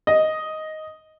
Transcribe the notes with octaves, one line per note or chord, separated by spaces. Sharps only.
D#5